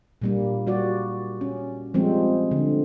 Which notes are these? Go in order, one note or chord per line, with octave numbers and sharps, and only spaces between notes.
A#2 G3 A#3
G3 F#4 D5
C#4
F3 G3 G#3 C4
D3